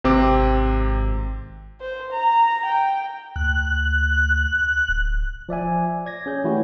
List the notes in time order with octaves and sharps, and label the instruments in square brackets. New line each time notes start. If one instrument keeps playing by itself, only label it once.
[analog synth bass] G#1 [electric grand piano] C3 C4 D6
[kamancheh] C5
A#5
G5
[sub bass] D2 [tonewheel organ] F#6
[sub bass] D1
[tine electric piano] F3 D5 E5 G#5
D5 G#6 A#6
C#4 G#4 G6
E3 A3 E4 F#4 G4 C#5